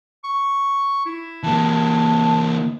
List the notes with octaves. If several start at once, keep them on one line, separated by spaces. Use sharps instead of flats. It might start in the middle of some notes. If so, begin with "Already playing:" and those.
C#6
E4
E3 A#3 A5